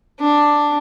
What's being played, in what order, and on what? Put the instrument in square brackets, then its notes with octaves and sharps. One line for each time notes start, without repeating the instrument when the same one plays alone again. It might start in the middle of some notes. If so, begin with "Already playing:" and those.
[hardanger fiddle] D4